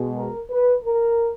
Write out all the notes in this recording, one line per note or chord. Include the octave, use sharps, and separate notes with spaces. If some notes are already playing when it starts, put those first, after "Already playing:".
Already playing: B2 G#3
A#4
B4
A#4